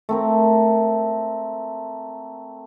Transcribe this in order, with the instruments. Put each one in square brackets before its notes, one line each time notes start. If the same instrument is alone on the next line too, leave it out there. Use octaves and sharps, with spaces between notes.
[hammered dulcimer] A3 C4 A#4